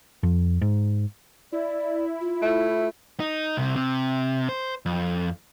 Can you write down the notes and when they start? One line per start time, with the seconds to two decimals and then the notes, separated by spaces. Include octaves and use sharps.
0.23 F2
0.62 G#2
1.52 E4 D5
2.21 F4
2.42 A3
3.20 D#4
3.57 C2 C3
3.76 C3
4.49 C5
4.86 F2